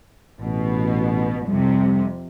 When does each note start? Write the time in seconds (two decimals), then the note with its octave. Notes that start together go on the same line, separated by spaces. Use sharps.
0.40 A1 B2
1.48 F2 C3 G3